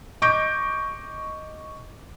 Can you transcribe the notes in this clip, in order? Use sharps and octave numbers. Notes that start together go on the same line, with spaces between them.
D#5 C#6 D6 G6 A#6 D7